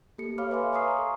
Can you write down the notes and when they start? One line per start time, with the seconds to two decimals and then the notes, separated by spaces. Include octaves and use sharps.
0.18 A#3 G4 A4 C#7
0.38 C#5 F5 B5 D6 F6
0.51 B4 C#5 E5 F5 G#5 C6
0.73 F5 G#5 A#5 C#6 D#6 C7
0.98 A4